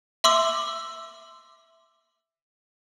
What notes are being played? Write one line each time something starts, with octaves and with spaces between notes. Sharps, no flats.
E5 C6 D6 E6